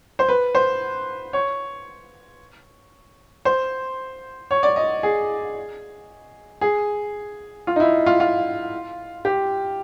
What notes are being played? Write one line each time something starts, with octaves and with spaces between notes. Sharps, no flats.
C5
B4
C5
C#5
C5
C#5
D5
D#5
G#4
G#4
F4
D#4
E4
F4
F4
G4